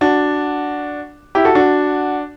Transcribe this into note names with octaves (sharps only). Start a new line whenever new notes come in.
D4 F#4
E4 G4
F#4 A4
D4 F#4